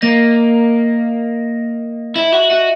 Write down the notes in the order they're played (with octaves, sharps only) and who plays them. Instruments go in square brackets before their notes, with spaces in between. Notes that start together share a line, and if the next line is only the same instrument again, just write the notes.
[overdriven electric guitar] A#3 [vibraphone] D#5
[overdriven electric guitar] E4 [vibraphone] E5
[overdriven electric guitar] F#4 [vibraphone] E5
[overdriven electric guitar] F#4 [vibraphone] D#5